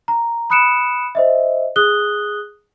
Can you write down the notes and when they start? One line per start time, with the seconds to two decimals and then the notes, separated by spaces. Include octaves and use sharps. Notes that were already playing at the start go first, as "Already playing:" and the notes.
0.08 A#5
0.50 B5 D#6 F#6 C#7 D7 E7
1.15 C5 D#5 E5
1.76 G#4 D#6 F#6 G7